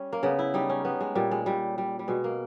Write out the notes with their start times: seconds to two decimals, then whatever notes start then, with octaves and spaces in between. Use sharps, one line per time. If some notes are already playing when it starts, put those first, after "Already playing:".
Already playing: G3 C#4
0.13 A#3
0.23 C#3 B3
0.39 E4
0.54 G3 D#4
0.69 C#4
0.85 G3 B3
1.01 G#3
1.15 A#2 G3
1.31 G#3
1.46 A#2 G3
1.78 G3
1.99 G3
2.08 B2 G#3
2.24 A#3